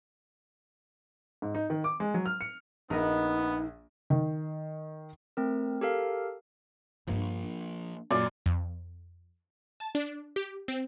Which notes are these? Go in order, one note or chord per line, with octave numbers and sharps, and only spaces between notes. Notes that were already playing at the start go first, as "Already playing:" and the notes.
G#2
D#4
D#3
D6
G#3
F#3
F6
C#7
A#1 A#3 B3 D#4 A#4 D#5
D#3
A3 C4 A#4
G4 A4 A#4 F5
G2 F3 A#3 D4
D4
F#2 A#2 D5
F2
A5
D4
G4
C4